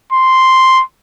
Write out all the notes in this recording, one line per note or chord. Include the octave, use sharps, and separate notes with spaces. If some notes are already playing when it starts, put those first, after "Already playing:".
C6